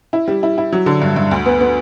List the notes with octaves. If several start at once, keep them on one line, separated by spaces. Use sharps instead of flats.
E4
G3
E4
E4
F#3
D3
G2
G2
D2
B3
B3